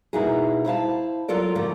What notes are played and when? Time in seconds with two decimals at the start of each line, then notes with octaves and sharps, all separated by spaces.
0.13 B2 A#3 D#4 E4 F#4 G#4
0.65 E4 C5 F5 A5
1.28 F#3 F4 A4 A#4 D5
1.55 A2 D3 F3 G3 A3 A#3